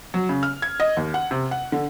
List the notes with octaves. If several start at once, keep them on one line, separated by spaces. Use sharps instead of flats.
F#3
C#3
F6
G#6
D#5
D#2
F#5
C3
F#5
D3